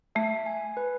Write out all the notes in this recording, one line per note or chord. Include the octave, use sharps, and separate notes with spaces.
A3 E5
G#5
B4